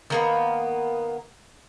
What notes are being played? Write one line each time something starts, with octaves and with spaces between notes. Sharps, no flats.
D#3 A#3 B3